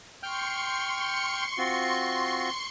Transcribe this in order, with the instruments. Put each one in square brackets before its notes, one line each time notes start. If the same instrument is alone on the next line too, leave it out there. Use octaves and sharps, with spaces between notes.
[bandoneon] G5 F6 G6 [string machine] C6 C#6 C#7
[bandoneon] C4 F4 F#4